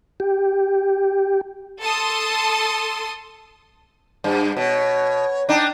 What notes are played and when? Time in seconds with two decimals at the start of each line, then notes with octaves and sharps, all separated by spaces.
0.20 G4
1.80 A4 A5 C6 D#6
4.24 G2
4.57 B2 C#5
5.49 D4 D#4 G5